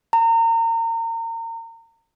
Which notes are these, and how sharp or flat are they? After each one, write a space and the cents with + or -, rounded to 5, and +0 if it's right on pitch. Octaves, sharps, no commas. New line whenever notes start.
A#5 -30